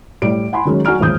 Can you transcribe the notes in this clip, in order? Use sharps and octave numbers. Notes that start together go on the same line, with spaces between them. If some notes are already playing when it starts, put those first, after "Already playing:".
A2 G3 D7
F#5 G#5 B5 C6
D#3 F#3 G#3 C#4
F#3 F#4 G#5 A#5 F6 D7
A1 D#2 G#2 F4 D#6 G6